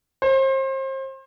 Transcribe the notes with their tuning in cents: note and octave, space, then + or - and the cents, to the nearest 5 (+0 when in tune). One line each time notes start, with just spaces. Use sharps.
C5 +35